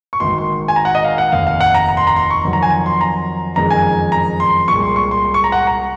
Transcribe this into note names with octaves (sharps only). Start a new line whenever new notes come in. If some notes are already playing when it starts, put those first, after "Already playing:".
C#6
G#1 G#2 D#3 C6
C6
G#5
A#5
F#5
D#5
F5
F#5
F1 D#2 D#3 F5
F5
F#5
A#5
A#5
C6
A#5
C6
C#6
F2 D#3 F#3
A#5
G#5
C6
A#5
F#1 F2 D#3 G#3 A#5
G#5
A#5
C6
C2 A#2 G#3 C#6
C6
C#6
C6
C6
C#6
A#5
F#5
A#5